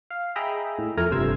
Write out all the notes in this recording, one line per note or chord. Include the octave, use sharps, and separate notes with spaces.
F5
G#4 D#5 E5 G5 A#5 B5
A2
F2 A3 A#4 G#5 A#5
G1 G2 C3 C5 E6 G#6